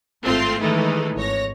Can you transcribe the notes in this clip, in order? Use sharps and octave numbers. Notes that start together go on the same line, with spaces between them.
G#1 A2 A3 C4 F4 C6
D#3 E3 G#3 A3 D#4 E4
G#1 C#5 A#6